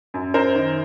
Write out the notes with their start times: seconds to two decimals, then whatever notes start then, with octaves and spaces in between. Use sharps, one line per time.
0.14 F#2
0.34 F#2 A#4 C5
0.55 D#3